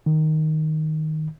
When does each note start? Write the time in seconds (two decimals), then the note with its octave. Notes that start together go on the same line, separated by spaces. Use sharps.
0.06 D#3